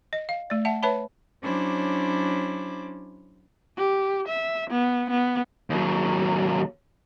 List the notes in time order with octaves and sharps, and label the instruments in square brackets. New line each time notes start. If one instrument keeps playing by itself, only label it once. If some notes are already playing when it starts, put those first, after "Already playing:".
[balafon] D#5
F5
A3 D5
E5 F#5 A5
B4 C#5 E5 A5 B5
[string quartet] F#3 C#4 D4 E4 C5 D6
[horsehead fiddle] G4
E5
B3
B3
[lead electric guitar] D#2 F#3